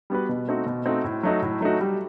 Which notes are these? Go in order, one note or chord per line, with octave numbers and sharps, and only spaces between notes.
G3 B3 F#4 B4
B2
A3 C4 D#4 F#4
B2
A3 C4 D#4 F#4
A2
F#3 A3 D#4 F#4
A2
F#3 A3 D#4 F#4
G3